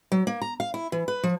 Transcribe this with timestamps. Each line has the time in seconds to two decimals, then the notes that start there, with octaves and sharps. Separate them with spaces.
0.12 F#3
0.27 A#3
0.41 A#5
0.60 F5
0.74 E4
0.92 E3
1.08 B4
1.23 F3